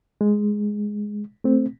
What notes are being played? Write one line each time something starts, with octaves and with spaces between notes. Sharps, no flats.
G#3
A3 C4